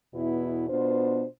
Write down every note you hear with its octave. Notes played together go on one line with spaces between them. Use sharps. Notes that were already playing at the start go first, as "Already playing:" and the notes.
E2 B2 B3 E4
B2 B3 D4 F4 C5